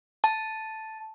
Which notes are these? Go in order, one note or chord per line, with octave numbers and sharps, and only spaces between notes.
A5